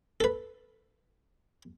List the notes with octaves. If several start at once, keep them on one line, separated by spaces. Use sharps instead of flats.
A4 B4